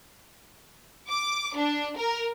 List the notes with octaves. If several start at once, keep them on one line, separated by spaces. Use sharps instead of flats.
D6
D4
A#4